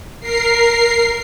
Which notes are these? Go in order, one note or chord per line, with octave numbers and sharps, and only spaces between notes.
A#4 C7